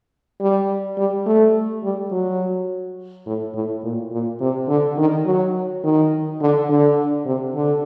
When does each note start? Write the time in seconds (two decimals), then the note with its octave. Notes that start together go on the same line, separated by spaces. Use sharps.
0.41 G3
0.98 G3
1.26 A3
1.83 G3
2.12 F#3
3.26 A2
3.55 A2
3.83 A#2
4.12 A#2
4.40 C3
4.69 D3
4.97 D#3
5.26 F#3
5.83 D#3
6.41 D3
6.70 D3
7.26 C3
7.55 D3